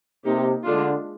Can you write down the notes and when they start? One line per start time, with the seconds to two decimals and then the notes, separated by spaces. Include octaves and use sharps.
0.25 C3 A#3 D#4 G4
0.65 D3 G#3 D4 F4